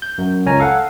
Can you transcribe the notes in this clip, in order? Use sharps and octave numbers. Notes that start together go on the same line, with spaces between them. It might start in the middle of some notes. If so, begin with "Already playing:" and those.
G6
F#2
C#2 C#4 G#5 A#5
A4 F5 F#5